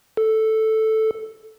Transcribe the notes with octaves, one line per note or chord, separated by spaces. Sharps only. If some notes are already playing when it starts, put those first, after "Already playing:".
A4